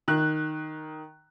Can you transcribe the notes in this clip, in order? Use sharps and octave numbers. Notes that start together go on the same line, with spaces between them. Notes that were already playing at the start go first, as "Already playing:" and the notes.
D#3 F#6